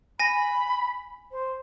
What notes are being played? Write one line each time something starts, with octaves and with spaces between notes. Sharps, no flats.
G#5 B5 A#6
C5